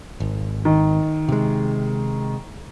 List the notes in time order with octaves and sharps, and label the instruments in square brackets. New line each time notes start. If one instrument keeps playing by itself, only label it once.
[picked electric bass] G#1
[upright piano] D#3
[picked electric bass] C3 G#3